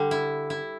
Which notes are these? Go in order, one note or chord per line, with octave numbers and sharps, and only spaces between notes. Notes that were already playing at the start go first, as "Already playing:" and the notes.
Already playing: D3 G3
E4
E4